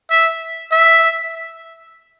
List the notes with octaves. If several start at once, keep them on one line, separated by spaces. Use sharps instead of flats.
E5
E5